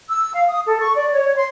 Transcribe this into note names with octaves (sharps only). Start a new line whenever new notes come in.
E6
F5
D#6
A4
C#6
D5
C#5
C6